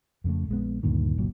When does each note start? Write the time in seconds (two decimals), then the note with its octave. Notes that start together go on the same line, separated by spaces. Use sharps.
0.24 F2 C#3 A3
0.49 A#1 G#3 B3
0.83 D2 G2 A#2 D#3
1.18 F#1 C2 A#2 F#3